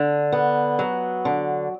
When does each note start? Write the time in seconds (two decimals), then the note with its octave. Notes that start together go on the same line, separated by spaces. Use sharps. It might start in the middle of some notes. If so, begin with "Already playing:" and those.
Already playing: D3
0.32 B3
0.79 F#3
1.25 D3